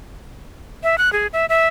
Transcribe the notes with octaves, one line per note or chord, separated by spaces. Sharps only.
E5
F#6
G#4
E5
E5